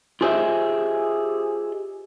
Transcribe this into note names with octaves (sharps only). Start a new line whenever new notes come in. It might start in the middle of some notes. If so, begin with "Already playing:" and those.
F4 G4 G#4 C5 D#5 E5